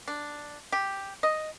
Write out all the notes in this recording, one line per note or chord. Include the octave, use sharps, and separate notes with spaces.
D4
G4
D#5